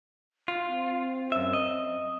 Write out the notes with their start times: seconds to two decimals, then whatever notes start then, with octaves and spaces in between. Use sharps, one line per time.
0.48 F4
0.67 C4
1.32 F#2 E5
1.53 D#5